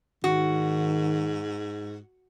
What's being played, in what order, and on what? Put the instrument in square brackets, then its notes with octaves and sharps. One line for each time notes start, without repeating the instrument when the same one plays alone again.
[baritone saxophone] G#2 [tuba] D#3 [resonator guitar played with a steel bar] F#4